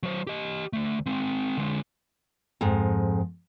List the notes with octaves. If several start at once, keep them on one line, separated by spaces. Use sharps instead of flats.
F#3 C5
G4 D#5
D2 A3
G#3 C4
D3 G#3
F2 G#2